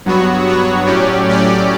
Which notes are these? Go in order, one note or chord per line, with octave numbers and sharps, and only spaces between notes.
G2 F#3 B3 F#4 C#5
G2 F#3 B3 F#4 C#5
A2 F#3 C#4 G4 D5
A2 F#3 C#4 G4 D5